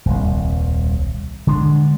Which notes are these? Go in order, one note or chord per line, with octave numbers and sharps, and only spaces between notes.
D#1 C2
D3 G#3 D4